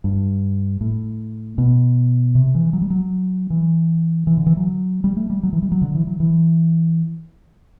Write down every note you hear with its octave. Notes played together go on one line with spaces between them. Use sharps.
G2
A2
B2
C3
E3
F#3
G3
F#3
E3
E3
D3
E3
F#3
G3
A3
G3
F#3
E3
G3
F#3
D3
E3
F#3
E3